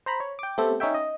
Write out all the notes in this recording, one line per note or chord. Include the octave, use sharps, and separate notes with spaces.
C5 A#5 B5
C#5
G5 D6
A3 B3 C4 G4 A4
C#4 D#4 C#5 E5 G5
D#5